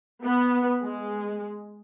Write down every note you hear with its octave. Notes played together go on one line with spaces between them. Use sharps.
B3
G#3